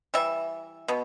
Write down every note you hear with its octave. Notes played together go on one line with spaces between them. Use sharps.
E3 G3 E5
B2 B3